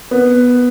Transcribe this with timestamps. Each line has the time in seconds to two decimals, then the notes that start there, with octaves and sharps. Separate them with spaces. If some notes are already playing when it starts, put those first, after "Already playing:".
0.11 B3